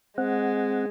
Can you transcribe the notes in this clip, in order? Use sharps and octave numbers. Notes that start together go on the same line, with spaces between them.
G#3 C4 F#5